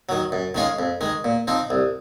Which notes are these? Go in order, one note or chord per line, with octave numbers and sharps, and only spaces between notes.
D#3 F#3
F#2
D#3 G#3 C#4 F4
F2
D#3 G#3
A#2
F3 C4 D#4
C2